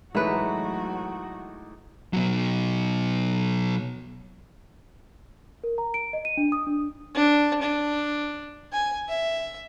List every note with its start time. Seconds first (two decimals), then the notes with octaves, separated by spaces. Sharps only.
0.15 A1 F#3 G#3 A3 D#4 F#4 B4
2.13 B2 F#3
5.64 A#4
5.78 A#5
5.94 D7
6.13 D#5
6.25 D#7
6.37 D4
6.52 D#6
6.67 D4
7.15 D4
7.62 D4
8.72 G#5
9.09 E5